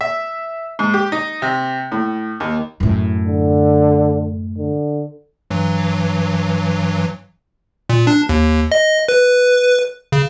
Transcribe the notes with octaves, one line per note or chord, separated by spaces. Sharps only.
E5
G#2
G4
D#4
C3
A2
D#2
F#2 A2
D3
D3
G2 E3 F#3
A#2
D4
D#2
D#5
B4
C#3